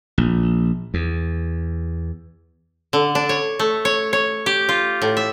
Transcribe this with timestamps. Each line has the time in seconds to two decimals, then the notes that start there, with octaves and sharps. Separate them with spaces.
0.18 A#1
0.94 E2
2.93 D3
3.15 D4
3.29 C#5
3.59 A3
3.85 C#5
4.13 C#5
4.46 G4
4.69 F4
5.02 A2
5.17 E5